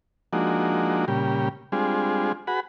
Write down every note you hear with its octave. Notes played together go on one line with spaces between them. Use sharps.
F3 G#3 A#3 D4 D#4 F#4
A#2 C#3 G3 G4
G3 G#3 C4 D4 F4 G#4
F#4 G#4 B4 F#5 B5